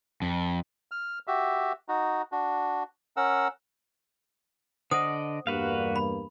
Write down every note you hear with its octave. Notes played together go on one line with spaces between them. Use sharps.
F2
F6
F#4 G4 E5
D#4 F#4
D4 F#4
C#4 A#4 F#5 E6
D3 C5 D5 D#5 F#5 D#6
E2 G2 A#3 F#4 B4 F5
B5